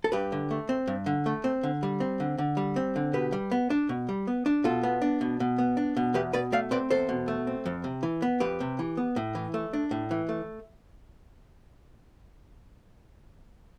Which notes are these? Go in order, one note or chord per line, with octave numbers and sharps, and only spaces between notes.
A4
G2 G4 B4
D3
A3
C4
G2
D3
A3
C4
D3
G3
C4
D3
D3
G3
C4
D3
B2 G4 B4
G3
B3
D4
B2
G3
B3
D4
B2 F4 A4
B3
D4
B2
B2
B3
D4
B2
E2 G4 B4
B2 B4 D5
A3 D5 F5
C4 B4 D5
E2 A4 C5
B2
A3
C4
F2
C3
E3
B3
F2 G4 B4
C3
E3
B3
A2
E3
A3
D4
A2
E3
A3